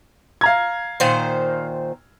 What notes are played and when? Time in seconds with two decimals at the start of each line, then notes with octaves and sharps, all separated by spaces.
0.41 F5 A#5 G#6
1.00 A#2 D#3 C5